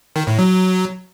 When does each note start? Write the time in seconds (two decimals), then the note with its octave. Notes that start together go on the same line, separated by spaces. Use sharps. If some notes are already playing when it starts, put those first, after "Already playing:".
0.16 D#3
0.27 A2
0.39 F#3